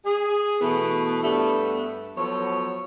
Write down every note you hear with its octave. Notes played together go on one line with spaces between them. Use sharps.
G#4
B2 E3 A3 B3
G2 G3 A3 B3
F3 F#3 B3 A4 C#5